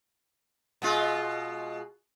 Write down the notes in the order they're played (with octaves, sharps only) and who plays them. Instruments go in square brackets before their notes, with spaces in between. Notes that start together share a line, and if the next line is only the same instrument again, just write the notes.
[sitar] B2 G#3 F4